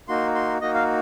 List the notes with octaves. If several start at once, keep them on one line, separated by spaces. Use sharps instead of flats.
A#3 D#4 F#4 C6
C6
A#3 D#4 F#4 D#5
F5